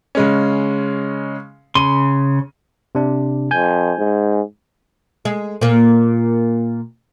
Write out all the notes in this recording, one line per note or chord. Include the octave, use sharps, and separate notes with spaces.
C#3 G#3 C#4
C#3 C6 D#7
C3 D4
F2 G#5 G6
G#2
G#3
A#2 A#3